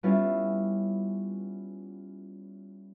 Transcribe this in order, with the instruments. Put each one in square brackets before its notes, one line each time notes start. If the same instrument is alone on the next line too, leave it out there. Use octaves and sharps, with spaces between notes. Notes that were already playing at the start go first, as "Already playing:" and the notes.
[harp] G3 B3 C#4 E4 F4